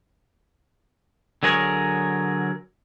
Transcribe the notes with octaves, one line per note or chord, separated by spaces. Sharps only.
D3 F#3 G#4 A#4 C#5